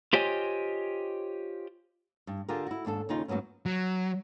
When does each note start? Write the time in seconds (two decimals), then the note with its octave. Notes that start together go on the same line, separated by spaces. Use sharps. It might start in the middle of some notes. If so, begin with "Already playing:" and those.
0.13 F4 G4 C5 C#5 D#5 G#5
2.27 G2
2.49 D3 F4 G4 G#4 A#4
2.67 E4 F#4
2.85 D#2 G#2 D4 A4
3.09 D#2 C#3 D#4 F4
3.28 G#2 F#3 A#3 B3 C#4
3.66 F#3